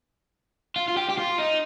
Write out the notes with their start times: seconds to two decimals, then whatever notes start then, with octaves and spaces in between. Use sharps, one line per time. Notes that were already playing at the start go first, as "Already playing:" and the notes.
0.76 F4
0.88 F4
0.97 G4
1.09 G4
1.18 F4
1.38 D#4